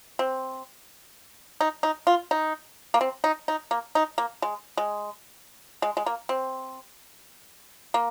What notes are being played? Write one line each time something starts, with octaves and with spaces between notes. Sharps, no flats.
C4
D#4
D#4
F4
D#4
A#3
C4
D#4
D#4
A#3
D#4
A#3
G#3
G#3
G#3
G#3
A#3
C4
A#3